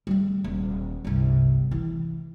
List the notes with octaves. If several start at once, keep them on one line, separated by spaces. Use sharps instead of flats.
G3 A3
D#1
G1 C2
E3